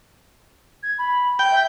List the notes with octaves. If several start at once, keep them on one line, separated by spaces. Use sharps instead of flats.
G#6
B5
G5
E5